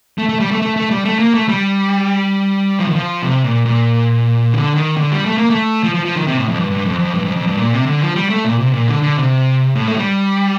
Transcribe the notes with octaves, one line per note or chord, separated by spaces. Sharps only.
A3
A3
G3
A3
A3
A3
G3
A3
A#3
A3
G3
F3
D#3
F3
C3
A#2
A#2
D3
D#3
D3
G3
A3
A#3
A3
F3
F3
F3
D#3
C3
A2
F2
G2
G2
F2
F2
G2
F2
F2
G2
A#2
C3
D3
F3
G3
A3
A#2
C3
A#2
D3
D3
C3
A2
A3
G3